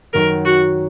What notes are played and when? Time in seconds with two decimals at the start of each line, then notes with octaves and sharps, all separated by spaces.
0.13 F#2 D#3 F#3 A#4
0.45 F#4